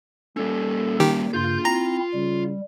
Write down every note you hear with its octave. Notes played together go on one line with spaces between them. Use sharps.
G3 A#3 C#4 A4
D#3 G4
G2 C#3 F4 C6 G6
C4 E4 A#5
C#3 G3